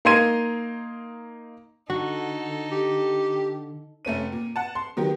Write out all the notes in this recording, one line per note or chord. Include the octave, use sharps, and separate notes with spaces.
A#3 D#4 A#5 C6 G#6 D#7
D3 D#4 F#4 A4
G4
F1 A3 C#4 D#7
A#2
F#5 A5
C6
D#3 F#3 B3 G4